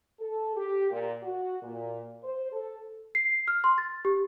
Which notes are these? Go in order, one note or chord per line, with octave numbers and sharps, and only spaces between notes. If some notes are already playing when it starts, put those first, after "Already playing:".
A4
G4
A#2
F#4
A#2
C5
A4
C7
F6
C6
A6
G4